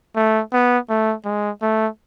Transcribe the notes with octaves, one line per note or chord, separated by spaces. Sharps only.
A3
B3
A3
G#3
A3